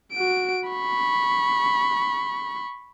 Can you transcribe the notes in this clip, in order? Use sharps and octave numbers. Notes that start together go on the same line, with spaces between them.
F#4 D7
B5 C#6